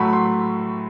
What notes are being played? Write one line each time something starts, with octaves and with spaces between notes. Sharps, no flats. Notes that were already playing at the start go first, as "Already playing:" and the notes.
Already playing: A2 F#3 A3 B5
C6